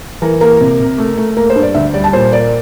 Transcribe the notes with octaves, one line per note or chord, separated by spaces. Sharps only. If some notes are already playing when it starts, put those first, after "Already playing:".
E3 A#4
A#3 A#4
C3
C3
A3
A3
A#3 A#4
C5
G2
D5
D2 E5
G3 D5
A5
A#2 C5
A#3 D5